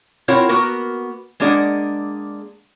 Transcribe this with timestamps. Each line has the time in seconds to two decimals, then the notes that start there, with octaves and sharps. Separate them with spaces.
0.28 C4 E4 F4 A#4 C#5 F#5
0.49 A#3 B3 F#4 A#4
1.40 G#3 A#3 D4 G#4 D5 F#5